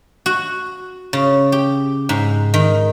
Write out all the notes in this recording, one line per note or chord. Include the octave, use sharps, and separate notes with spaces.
F#4
C#3
G4
G#2
D#3